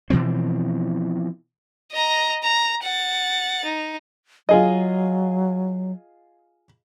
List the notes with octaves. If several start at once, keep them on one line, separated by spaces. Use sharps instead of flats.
B2 E3 F3 C4
D#5 A#5
A#5
F#5 A6
D#4
F#3 F4 G#4 D#5